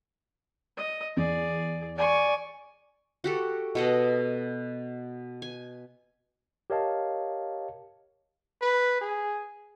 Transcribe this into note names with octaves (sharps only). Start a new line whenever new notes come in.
D#5
E2 G#4 D5
D5 G#5 C#6
F#4 G4 A4
B2 A4 D#5
G#5
G4 A#4 C#5 D#5 F5 A5
B4
G#4